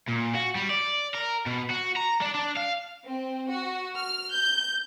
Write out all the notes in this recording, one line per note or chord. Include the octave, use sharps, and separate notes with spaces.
A#2
F#4
G3
D5
A#4
B2
F#4
A#5
D4
D4
F5
C4
F#4
F6
G6